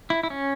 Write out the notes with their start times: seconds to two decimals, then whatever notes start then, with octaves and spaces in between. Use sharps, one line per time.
0.10 E4
0.23 E4
0.30 C#4